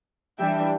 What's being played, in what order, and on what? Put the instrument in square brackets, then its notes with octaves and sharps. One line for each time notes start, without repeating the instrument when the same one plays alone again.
[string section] E3 G3 D4 E5 G5